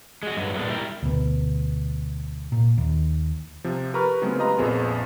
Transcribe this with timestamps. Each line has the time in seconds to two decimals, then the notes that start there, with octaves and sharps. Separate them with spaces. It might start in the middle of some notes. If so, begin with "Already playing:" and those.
0.23 G#3 F#4
0.37 G2 F#3 F#4
0.55 A#2 F#3 G#3 A3 B3 D4
0.68 G3 E4 G4 A#4
1.03 D2 B2
2.52 A#2
2.78 D#2
3.64 C3 F3
3.93 G4 A#4 B4 A#5 C#6 F6
4.22 C#3 F#3 G#3 A3 B3 C4
4.38 F4 G4 B4 D#5 A#5 C6
4.57 A#1 F2 F3 B3 G#4 A#4